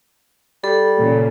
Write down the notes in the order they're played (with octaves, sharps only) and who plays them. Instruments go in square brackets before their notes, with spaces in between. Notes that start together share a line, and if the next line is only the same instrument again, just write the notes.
[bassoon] G3 [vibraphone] A4
[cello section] A#2 C#3